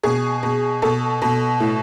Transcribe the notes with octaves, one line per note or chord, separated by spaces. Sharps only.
B2 G#4
B2
B2 A4
B2
A2